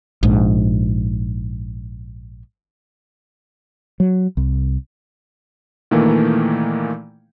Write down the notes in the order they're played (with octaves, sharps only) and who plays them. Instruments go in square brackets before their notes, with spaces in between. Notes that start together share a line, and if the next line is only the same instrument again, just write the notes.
[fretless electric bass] A#1 G#2
F#3
C2
[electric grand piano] A#2 D#3 E3 A3 A#3